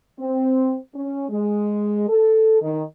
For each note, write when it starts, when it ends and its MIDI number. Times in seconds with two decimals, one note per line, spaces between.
0.19 0.77 60
0.95 1.25 61
1.29 2.06 56
2.08 2.59 69
2.61 2.82 51